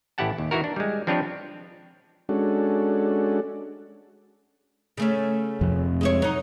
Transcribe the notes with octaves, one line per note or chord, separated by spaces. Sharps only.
A1 E4 G4 F#5 A5
D#2
D#3 E3 E4 F#4 A#4
D4
G3 G#3
F3 C4 D4 G4 B4 C#5
G#3 C#4 D4 F#4 A4
C#3 A3 C#4
F2 C3
G#3 E4 C#5
F#3 D#4